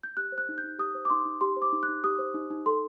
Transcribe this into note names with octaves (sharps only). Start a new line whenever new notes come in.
G6
G4 F#6
C5
F#6
D#4
G6
D#4
G4 D#6
C5
D6
D#4 C6
D#4
G4 C6
C5
D6
D#4
F#6
D#4
G4 D#6
C5
D#4
D#4
A4 C6